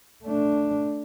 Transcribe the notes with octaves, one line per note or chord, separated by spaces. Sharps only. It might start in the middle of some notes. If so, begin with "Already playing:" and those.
A3 D4